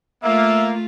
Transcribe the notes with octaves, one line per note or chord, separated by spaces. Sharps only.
A3 A#3 F4 E5